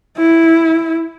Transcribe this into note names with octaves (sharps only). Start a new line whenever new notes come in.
E4